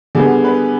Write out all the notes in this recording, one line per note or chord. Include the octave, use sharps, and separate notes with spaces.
D3 G3 B3 G#4
B4